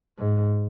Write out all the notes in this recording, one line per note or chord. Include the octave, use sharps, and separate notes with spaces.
G#2